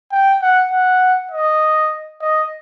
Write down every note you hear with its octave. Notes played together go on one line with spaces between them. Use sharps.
G5
F#5
F#5
D#5
D#5